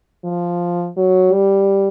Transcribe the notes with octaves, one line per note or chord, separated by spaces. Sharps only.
F3
F#3
G3